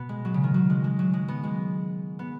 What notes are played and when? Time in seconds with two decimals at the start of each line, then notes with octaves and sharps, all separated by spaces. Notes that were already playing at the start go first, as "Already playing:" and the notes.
Already playing: B2 B3
0.09 G#3
0.25 F#3
0.34 C#3
0.44 D#3
0.54 F#3
0.70 G#3
0.84 G#3
0.99 F#3
1.13 G#3
1.28 B3
1.44 G#3
2.19 B3